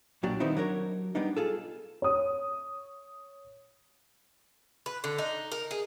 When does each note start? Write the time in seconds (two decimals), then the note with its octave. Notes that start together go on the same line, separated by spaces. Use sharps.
0.23 B1 A#2 F#3 D4 G4 D5
0.40 D#3 G3 B3 C4 D#4 E4
0.57 F#3 D4 A#4 C#5
1.15 G3 B3 D4 D#4
1.37 F4 G#4 A4
2.02 C#5 D#6
4.86 B4
5.04 D3
5.18 D#4
5.52 A#4
5.71 G#4